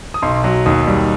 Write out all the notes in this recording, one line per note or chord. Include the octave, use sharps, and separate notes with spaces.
D#6
B1 C6
F#3
D#2 D#6
G3